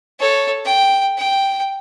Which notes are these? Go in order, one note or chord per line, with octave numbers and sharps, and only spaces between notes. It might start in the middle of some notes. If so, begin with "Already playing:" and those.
A4 C#5
G5
G5